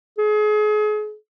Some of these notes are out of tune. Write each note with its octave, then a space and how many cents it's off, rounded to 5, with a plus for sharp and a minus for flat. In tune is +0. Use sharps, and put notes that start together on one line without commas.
G#4 +35